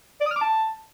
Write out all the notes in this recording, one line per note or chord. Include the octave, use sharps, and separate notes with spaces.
D5
D#6
F6
D6
A5